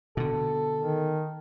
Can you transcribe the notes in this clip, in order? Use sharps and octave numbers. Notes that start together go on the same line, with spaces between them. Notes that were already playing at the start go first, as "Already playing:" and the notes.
B2 D3 A4
D#3